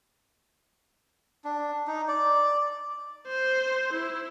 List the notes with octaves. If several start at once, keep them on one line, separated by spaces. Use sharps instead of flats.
D4
D#4
D5
C5
E4